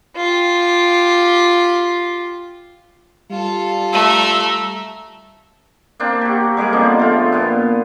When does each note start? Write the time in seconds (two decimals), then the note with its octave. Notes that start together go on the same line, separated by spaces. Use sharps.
0.17 F4 G4
3.31 G3 F4 A4
3.93 A3 A#5 E6
6.00 A#3 C4 D4
6.21 F#4 G4
6.57 G3 G#3 A#3 G#4
6.73 B2 D3 F3 C4
6.99 A3 F4
7.32 A#2 B3